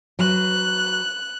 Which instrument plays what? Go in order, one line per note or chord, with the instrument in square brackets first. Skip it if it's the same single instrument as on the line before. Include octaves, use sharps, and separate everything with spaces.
[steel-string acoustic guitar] F#3 B4 [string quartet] F#6